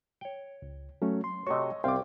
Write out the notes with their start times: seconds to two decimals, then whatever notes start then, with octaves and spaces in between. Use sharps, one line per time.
0.21 C#5 G5
0.62 C#2
1.02 F#3 A3 C#4
1.24 C6
1.47 C3 A3 F#4 C#5 D#5 C#6
1.84 C2 C4 F5 G5 C6 D6